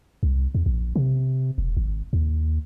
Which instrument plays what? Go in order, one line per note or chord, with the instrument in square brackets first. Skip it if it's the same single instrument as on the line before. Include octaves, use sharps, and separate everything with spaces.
[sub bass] C2
E2
A#1
C3
E1
G#1
D#2